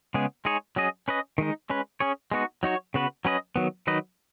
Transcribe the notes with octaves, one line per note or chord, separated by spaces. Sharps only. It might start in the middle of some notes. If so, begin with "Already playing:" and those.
C#3 G#3 B3 G#4
G#3 D#4 G#4 C#5
F#3 C#4 G#4 D#5
C#4 B4 D#5
D#3 G#3 D#4
G#3 C#4 B4
C#4 G#4 C#5
G#3 B3 D#4 F#4
F#3 D#4 F#4 C#5
C#3 B3 F#4 B4
F#3 C#4 B4 D#5
D#3 F#3 B3
D#3 F#3 D#4 B4 D#5